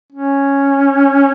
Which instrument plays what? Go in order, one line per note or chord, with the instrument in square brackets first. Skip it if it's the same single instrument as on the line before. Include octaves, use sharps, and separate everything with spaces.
[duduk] C#4